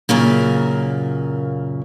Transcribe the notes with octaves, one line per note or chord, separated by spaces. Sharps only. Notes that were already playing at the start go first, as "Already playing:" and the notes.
F#2 A#2 C#3 A#3